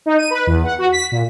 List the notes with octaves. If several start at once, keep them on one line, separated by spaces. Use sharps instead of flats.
D#4
D#7
B4
E2
F#5
F#4
B6
A#2